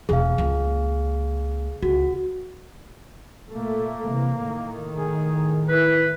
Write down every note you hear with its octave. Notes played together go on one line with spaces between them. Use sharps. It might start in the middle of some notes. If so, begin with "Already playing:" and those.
E1 A3 G#4 F5
C#2 A#3
C#2 F#4
A#2 A3 A#3
C3 E3
A2 D#3
G#4
E4 B4